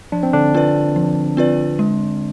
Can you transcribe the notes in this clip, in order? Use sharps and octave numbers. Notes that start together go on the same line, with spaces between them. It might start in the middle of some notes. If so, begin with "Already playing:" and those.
F3 D4
C4
D3 D4
C4 F4 B4 D5
F3
C4 F4 B4 D5
G#3